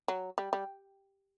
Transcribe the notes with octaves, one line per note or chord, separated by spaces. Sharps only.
F#3
G3
G3